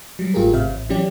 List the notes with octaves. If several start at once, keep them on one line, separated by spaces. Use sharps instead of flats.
F#3 G3
G#1 A2 F4 G4 G#4 A#4
G#1 C3 E5 F5
A1
E3 F#3 C#4 G4 D5